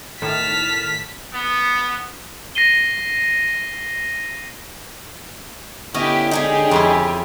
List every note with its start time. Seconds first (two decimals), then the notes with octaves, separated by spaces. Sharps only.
0.22 A2 D#3 A5 F6 B6
1.33 B3
2.55 A#6 C7 D#7 G7
5.94 D3 B3 C#4 E4 G4 D#5
6.31 C#3 G#3 D#4 G4 G#4
6.71 F2 C#4 E4